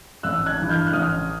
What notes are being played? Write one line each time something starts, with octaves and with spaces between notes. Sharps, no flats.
A1 E6 F#6
F#6 G#6
G2 E3
F6 G6
F#6
A1 D#6 F6